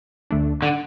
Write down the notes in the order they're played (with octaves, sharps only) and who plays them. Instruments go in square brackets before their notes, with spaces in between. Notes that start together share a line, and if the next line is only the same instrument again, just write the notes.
[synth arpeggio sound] D2 D3 A3 D4
[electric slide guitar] D3